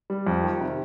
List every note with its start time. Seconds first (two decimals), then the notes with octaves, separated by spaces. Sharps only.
0.10 G3
0.27 F2
0.44 D#3
0.61 C3